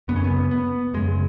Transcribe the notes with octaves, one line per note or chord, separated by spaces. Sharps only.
F#2 C#3 B3
C#4
B3
B3
F#2 C#3 G#3